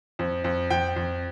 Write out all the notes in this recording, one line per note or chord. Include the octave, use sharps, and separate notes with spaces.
F2
F2
F2 G5
F2